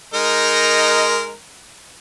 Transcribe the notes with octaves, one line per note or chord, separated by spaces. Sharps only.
G#3 D#4 A#4